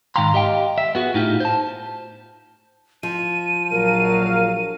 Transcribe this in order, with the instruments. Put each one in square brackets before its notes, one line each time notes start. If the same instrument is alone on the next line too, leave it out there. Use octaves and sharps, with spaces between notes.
[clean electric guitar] G#2 D#3 F5 G5 A#5 C6
G4 D#5 F5 G5
E5
B3 F#4 G#4
A2 D#4 F4 G4
C5 A5
[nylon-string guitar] F3 [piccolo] D#7
[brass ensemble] A#1 F#3 F5 [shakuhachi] A#4